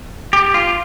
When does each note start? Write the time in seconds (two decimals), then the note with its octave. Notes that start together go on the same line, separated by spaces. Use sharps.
0.33 G4
0.54 F4